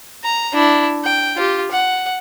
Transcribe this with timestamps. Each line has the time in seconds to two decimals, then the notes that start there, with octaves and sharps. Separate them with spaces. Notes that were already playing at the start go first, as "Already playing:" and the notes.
0.24 A#5
0.53 D4 E4
1.04 G5
1.36 F4 G4
1.71 F#5